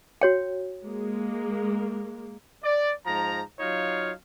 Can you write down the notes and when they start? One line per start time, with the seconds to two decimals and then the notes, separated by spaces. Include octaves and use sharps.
0.21 F#4 C#5 G5
0.83 G#3 A#3
2.64 D5
3.06 G#2 F3 A#5
3.60 F#3 D#4 F4 C#5 F5